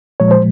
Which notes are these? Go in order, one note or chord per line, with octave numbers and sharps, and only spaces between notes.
A#2 F3 G#3 C#5
C5